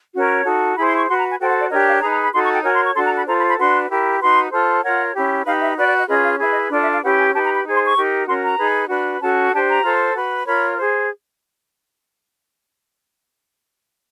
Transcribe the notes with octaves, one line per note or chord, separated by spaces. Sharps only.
C#4 F#4 A#4 C#5
D#4 F#4 A4
E4 G#4 C5 B5
C6
C#6
F#4 B4 C6
A#5
G#5
F#4 A4 C5 G5
F#5
D5
D4 G4 A#4 C#5 D#5
F5
D#4 G#4 B4 A#5
A#5
B5
D#4 F#4 A4 C6
C#6
G5
F#4 A#4 C#5 G#5
C6
C#6
D4 F#4 A4 C6
A#5
B5
F4 A4 C5 A#5
B5
B5
D4 F#4 B4 C6
E4 G4 A#4
D#4 F#4 B4 C6
F4 A4 C5
F4 A#4 C#5 F#5
C#4 E4 G4
D#4 G4 B4 F5
E5
F#4 B4 D5
D5
D#5
C#4 F4 G#4 B4 D#5
F5
E4 G#4 B4 E5
D#5
D4 F4 A4 D5
E5
F5
C#4 E4 G4 B4 F#5
G#5
D#4 G4 B4 A5
A#5
B5
D#4 G#4 C5
C6
C#6
D#4 G4 A#4
C#4 F#4 A#4 C6
A#5
D#4 G#4 B4
D4 F#4 B4
C#4 F#4 A4 A5
D4 G4 C5 A5
A#5
F4 A4 C5
F#4 B4
F4 A#4 C#5 B5
G#4 C5